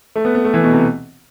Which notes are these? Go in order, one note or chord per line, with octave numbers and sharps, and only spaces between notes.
A3
B3
B3
A3
E3
B2
C3